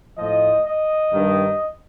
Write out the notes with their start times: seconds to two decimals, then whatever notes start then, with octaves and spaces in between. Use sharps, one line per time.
0.18 A2 F3 D#5
0.65 D#5
1.12 G2 D#3